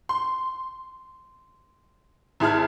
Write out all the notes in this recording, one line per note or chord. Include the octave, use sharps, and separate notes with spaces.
C6
G#1 E4 G#4 A5 F6